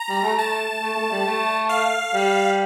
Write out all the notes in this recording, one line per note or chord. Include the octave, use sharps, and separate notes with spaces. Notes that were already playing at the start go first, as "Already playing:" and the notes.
Already playing: A#5
G3
A3
A5
A3
A3
G3
A3
F5
G3